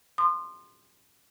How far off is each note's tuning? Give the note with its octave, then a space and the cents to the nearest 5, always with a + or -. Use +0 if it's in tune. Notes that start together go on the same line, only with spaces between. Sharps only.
C6 +0 D#6 -40